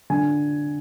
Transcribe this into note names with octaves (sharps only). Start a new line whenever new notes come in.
D3 G#5